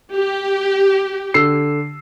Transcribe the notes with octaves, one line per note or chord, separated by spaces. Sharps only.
G4
D3 E6 C7